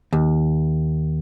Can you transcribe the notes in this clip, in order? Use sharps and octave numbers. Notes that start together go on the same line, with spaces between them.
D#2